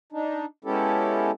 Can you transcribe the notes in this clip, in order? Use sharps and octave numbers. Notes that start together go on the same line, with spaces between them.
D4 D#4
G#3 B3 C#4 E4 G4 A4